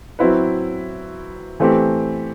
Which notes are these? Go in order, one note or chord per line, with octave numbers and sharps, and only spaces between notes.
F#3 C4 E4 B4
E3 A3 C4 G4